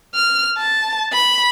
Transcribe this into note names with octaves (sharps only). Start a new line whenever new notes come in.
F6
A5
B5